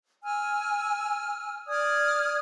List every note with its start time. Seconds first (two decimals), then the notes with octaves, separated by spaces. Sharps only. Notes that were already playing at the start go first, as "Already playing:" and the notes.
0.24 G#5 E6 F6
1.67 D5 D#6 F6 G#6